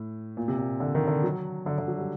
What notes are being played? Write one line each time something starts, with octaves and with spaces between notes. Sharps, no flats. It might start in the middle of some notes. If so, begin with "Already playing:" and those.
Already playing: A2
A#2
C3
A#2
D3
D#3
D3
F#3
D3
D3
F#3
G3